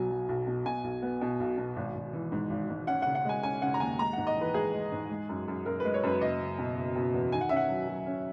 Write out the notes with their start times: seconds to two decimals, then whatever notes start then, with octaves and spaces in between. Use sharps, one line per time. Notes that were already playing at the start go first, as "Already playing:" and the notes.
Already playing: B1 B2 F#3 G#5
0.10 F#3
0.29 B1
0.47 B2
0.65 B2 G#5
0.84 B1
1.02 B3
1.21 B2
1.40 B1
1.58 B2
1.76 G#1
1.95 G#1
2.13 E3
2.32 G#2
2.50 G#1
2.70 G#2
2.87 C#4 F#5
3.02 F#5
3.06 C#3
3.15 F#5
3.25 G#3 G#5
3.43 C#4 G#5
3.62 C#3 F#5
3.74 A#5
3.80 D#2 G#5
3.99 G#3 A#5
4.13 G#2 F#5
4.27 D#5
4.36 E3
4.41 B4
4.54 G#3 G#4
4.73 G#3
4.92 G#2
5.10 G#3
5.29 F#2
5.48 F#2
5.66 F#2 A#4
5.80 G#3 B4
5.94 C#5
6.03 F#2 B4
6.21 F#1 D#5
6.40 F#1
6.58 B2
6.76 F#1
6.96 B2
7.14 E2
7.32 D#3 G#5
7.41 F#5
7.49 C#4 E5
7.56 F#5
7.69 F#3
7.87 F#3
8.06 C#4